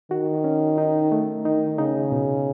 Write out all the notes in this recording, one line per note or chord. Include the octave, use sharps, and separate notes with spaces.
D#3 F#4
C#4
D#4
A3
D#3 D#4
C#3 D#4
B2